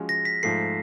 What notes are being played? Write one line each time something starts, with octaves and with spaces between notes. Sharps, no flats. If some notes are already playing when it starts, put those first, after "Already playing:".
Already playing: F3 G#3 C#4 F#4
A#6
B6
G#2 F3 A3 C7